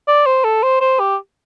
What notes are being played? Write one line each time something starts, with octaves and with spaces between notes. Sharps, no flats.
D5
C5
A4
C5
C5
G4